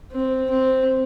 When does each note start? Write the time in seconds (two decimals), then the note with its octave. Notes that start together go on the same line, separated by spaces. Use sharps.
0.12 C4
0.50 C4